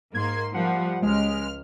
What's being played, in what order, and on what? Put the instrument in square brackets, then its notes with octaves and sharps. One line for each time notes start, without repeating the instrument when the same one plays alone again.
[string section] G#2 A#3 C6 [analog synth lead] G#6
[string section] F3 G3 [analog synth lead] F#5
[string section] C#2 F6 [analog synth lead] G#3